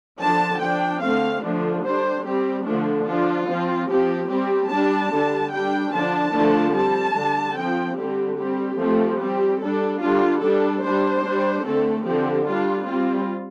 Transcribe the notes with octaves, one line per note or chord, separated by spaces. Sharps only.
D3 F3 D4 A5
F3 D4 G5
D3 A3 C4 F5
D3 F3 A3 D4
G3 D4 C5
G3 C4 G4
D3 F3 A3 D4
F3 D4 F4
F3 C4
F3 C4 G4
G3 C4 G4
G3 D4 A5
D3 G3 D4
G3 D4 G5
D3 F3 D4 A5
D3 F3 A3 D4
G3 C4 A5
D3 G3 D4
F3 C4 G5
D3 G3 C4 G4
G3 C4 G4
F3 A3 C4
G3 C4 G4
G3 D4 A4
D3 G3 D4 F4
G3 D4 A4
G3 D4 C5
G3 D4
D3 A3 C4 A4
D3 F3 C4 G4
G3 D4 F4
G3 C4 F4